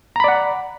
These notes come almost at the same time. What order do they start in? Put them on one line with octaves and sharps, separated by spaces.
A#5 B5 D5 F#5